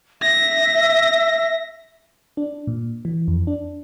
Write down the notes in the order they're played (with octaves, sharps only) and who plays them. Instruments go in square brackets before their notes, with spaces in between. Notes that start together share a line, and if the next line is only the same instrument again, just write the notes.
[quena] E5 [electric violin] A#6
[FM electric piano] D4
A#2
E3
F2
D4